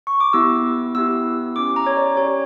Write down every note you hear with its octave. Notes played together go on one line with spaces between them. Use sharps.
C#6
D6
B3 E4 G4 E6
B3 E4 G4 E6
C#4 G4 D6
A#5
C#5
D5
C#4 G4 C#5